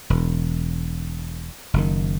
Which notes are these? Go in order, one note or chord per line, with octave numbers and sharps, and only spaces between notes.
E1
F#1 D#3